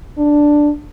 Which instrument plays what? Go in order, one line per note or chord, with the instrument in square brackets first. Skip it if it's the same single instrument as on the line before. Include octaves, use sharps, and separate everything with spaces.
[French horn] D4